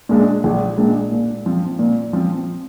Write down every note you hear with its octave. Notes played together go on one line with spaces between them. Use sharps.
A#2 G#3 D4
A#1
A#2 G#3 D4
A#2
F3 C4
A#2
F3 C4